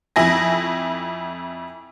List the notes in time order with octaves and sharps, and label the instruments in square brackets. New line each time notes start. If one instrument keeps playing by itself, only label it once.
[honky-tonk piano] F2 E4 G#5 A#6